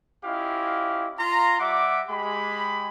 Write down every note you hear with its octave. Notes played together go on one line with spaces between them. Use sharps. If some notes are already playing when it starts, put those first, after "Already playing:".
C#4 E4 F4 G4 D#5 F5
F4 A#5 C6
G3 E5 F#5 D6
G#3 G4 B5